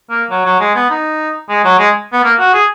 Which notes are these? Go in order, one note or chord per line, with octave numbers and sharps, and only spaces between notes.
A#3
F#3
F#3
G#3
B3
D#4
G#3
F#3
G#3
B3
A#3
F#4
G#4